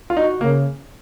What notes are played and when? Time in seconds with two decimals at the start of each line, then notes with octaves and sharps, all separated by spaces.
0.10 F4
0.17 D#4 F#4
0.41 C#3 A#3